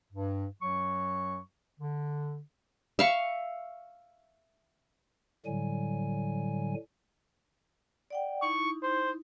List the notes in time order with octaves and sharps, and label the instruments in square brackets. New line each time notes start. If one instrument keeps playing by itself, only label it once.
[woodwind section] G2
F#2 F#3 C#6
D3
[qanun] E5 F5 C#6
[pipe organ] A2 D3 F#3 G3 G#5
[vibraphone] D5 F#5 G5
[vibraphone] D#4 E4 [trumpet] C#6
[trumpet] C5